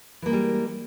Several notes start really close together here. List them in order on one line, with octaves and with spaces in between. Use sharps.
E3 A#3 G#3 G3